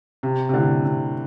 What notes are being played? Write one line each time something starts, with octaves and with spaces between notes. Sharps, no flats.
C3
C3
A2 D3
C3